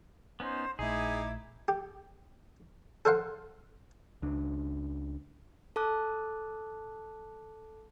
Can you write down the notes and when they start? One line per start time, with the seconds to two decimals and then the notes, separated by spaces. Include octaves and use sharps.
0.40 B3 C#4 D#4 C5
0.79 A#1 A3 D#4 E4 G#4 D6 G#6
1.68 G4
3.05 A4 A#4 C5 F5 F#5
4.22 C#2 D4
5.76 A4 A5 D6 F#6